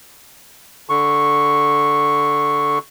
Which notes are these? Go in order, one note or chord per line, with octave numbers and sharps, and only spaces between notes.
D3 C#6